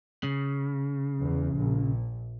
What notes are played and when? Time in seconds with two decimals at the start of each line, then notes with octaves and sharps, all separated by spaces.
0.23 C#3
1.22 E2
1.56 A#1